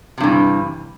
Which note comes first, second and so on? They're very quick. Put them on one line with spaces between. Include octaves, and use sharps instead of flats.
C3 G2 E3